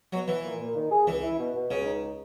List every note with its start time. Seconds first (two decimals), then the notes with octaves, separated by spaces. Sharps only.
0.12 B2 F#3
0.28 E3 B4
0.44 A#2
0.60 A#2
0.75 D#3
0.91 G#4
1.07 C#2 E3
1.23 E4
1.38 B2
1.55 B2
1.70 C#2 C#3
1.85 D#4